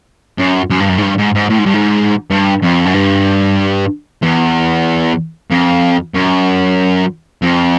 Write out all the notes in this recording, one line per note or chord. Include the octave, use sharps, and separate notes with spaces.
F#2
F#2
G2
F#2
G#2
G2
G#2
G#2
A2
G#2
G2
G#2
G2
F2
F#2
G2
E2
F2
F#2
F2